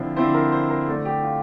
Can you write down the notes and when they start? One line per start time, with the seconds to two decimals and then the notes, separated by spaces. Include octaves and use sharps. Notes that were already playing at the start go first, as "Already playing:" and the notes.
Already playing: D3 F3 C4 E4
0.16 D3 F3 C4 E4 C5
0.34 A#4
0.52 C5
0.70 A#4
0.88 D3 A3 D4 A4
1.05 G4
1.23 F4